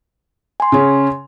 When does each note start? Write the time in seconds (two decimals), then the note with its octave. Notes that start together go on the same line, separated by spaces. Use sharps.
0.60 G#5 C6
0.72 C#3 C#4